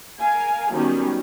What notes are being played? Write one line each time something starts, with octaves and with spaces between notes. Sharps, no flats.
A#4 F5 G#5
D#3 F#3 G3 B3 C#4